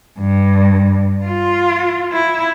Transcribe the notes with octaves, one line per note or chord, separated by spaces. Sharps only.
G2
F4
E4